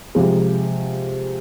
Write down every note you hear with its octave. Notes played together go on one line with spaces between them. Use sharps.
C3 F3 G#3